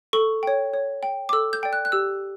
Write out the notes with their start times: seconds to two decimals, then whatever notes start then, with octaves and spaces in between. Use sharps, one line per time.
0.13 A4 C#6
0.43 C#5 G5
0.74 C#5
1.03 G5
1.29 D6
1.33 A4 E6
1.53 G6
1.63 D5 G5
1.73 F#6
1.85 F#6
1.92 G4 E6